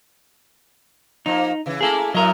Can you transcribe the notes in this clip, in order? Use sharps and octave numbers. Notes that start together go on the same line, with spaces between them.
F3 A#3 D#4
C#3 E3
A3 A#3 E4 G#4 A4
A2 F#3 E4 A#4 D#5